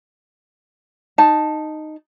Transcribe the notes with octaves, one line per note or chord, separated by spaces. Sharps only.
D#4 A5